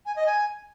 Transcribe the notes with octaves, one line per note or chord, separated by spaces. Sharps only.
G#5
D#5
G#5